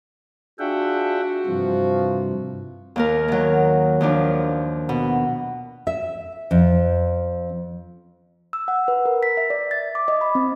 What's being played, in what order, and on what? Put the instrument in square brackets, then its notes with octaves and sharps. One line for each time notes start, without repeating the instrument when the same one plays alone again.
[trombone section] D4 F4 G#4 [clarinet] F#4 [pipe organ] E5 F#5 G5
[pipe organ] G2 C3 [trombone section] E3 F3
[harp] D#2 A#3 A#4
D#3 F#3
D#2 F3 D4
B2
[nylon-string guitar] E5
F2
[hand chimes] E6
F#5
B4
A#4
B6
E5
D5
A6
D6
D#5
B5
C4